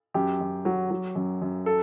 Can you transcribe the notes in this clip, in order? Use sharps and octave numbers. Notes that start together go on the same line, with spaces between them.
F#2 G4
F#2
F#3
F#3
F#2
F#2
A4